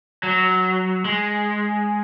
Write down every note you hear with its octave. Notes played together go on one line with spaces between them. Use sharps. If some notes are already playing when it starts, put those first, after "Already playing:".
F#3
G#3